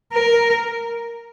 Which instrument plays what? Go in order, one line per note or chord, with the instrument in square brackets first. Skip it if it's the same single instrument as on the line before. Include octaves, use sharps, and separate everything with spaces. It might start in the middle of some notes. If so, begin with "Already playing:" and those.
[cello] A#4